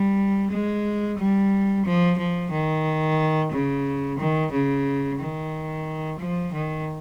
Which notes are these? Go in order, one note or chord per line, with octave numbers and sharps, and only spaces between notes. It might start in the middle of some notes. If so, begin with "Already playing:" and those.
Already playing: G3
G#3
G3
F3
F3
D#3
C#3
D#3
C#3
D#3
F3
D#3